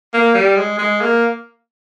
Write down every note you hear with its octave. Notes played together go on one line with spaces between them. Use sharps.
A#3
G3
G#3
G#3
A#3